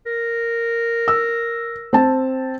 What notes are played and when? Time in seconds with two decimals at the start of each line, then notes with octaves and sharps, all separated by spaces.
0.07 A#4
1.08 E6
1.93 C4 A5